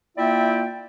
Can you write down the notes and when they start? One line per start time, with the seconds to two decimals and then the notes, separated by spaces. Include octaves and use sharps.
0.18 A#3 E4 F4 D5 E5 G5